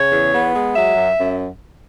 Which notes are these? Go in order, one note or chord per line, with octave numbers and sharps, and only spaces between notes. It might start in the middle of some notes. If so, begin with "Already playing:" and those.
Already playing: C#3 C#5
E2
B3
G#3
F#3 E5
F#2
F#2